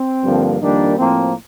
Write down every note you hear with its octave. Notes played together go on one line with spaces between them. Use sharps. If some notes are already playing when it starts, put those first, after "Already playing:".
Already playing: C4
G2 D3 F3 A#3
F2 D#3 G3 A#3 D4
A2 F3 A#3 C4